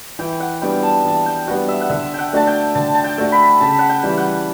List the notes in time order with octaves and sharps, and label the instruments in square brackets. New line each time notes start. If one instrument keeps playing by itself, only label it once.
[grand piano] E3 [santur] G5
[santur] F#5
[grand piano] G3 B3 D4 F#4 [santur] G5
[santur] A5
[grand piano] E3 [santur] A5
[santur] G5
[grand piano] G3 B3 D4 F#4 [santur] F#5
[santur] E5
F#5
[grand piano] D3 [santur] E5
[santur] F#5 G5
[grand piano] A3 D4 F#4 [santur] A5
[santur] G5
[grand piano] D3 [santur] A5
[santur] A5
G5
[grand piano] A3 D4 F#4
[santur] B5
[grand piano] C#3 [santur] A5
[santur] F#5
G5
[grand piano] E3 G3
[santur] F#5